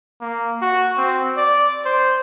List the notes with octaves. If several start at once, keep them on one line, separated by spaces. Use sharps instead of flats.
A#3
F#4
C4
D5
C5